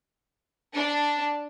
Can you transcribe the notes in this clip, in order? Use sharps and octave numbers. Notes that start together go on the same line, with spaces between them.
D4